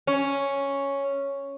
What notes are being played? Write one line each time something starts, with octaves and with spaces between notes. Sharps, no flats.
C#4